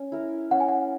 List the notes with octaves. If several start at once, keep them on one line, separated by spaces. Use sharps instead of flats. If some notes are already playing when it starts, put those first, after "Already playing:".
Already playing: C#4
E4 A#4
C#4 F#5
G#5
F#5